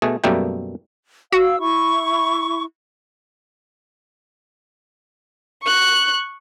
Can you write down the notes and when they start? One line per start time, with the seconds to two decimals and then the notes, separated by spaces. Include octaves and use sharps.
0.02 B2 A3 G#4
0.24 F#2 B2 G3 A3 A#3 G5
1.32 F#4 F5 E6
1.60 E4 C#6
5.63 C#6 F#6